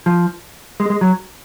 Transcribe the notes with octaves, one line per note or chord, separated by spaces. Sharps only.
F3
G#3
G#3
F#3